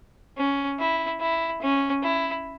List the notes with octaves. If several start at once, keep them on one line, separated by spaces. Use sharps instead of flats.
C#4
E4
E4
C#4
E4